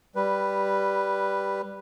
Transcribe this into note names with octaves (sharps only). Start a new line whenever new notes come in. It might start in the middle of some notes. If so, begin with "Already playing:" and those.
G3 B4